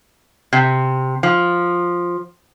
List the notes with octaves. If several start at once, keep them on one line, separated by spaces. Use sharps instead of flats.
C3
F3